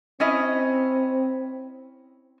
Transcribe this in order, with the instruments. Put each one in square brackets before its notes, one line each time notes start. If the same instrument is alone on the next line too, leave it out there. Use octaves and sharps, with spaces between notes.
[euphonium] C4 [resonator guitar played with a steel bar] C#4 E4 D#5